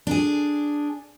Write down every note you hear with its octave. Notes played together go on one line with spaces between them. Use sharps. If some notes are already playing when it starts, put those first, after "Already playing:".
D4 G#4